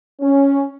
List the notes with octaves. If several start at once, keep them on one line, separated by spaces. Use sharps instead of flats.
C#4